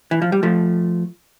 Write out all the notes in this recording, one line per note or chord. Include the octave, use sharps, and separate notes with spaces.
E3
F3
G3
F3 A3